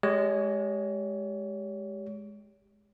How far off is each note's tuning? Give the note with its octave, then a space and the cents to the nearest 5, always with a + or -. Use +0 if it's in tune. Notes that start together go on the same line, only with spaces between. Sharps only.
G#3 +10 G4 +0 C#5 +35